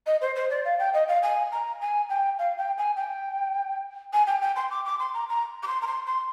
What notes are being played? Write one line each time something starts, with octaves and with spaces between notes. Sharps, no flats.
D#5
C5
C5
D5
F5
G5
D#5
F5
G#5
A#5
G#5
G5
F5
G5
G#5
G5
G#5
G5
G5
C6
D6
D6
C6
A#5
A#5
D6
C6
A#5
C6
C6